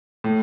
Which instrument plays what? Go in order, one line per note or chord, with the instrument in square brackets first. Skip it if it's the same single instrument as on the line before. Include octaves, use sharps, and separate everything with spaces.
[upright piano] A2